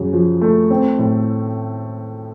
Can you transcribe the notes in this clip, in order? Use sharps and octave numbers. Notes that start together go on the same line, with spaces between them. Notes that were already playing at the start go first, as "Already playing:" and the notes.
Already playing: F#2 C#3
F3
A3
C4
A2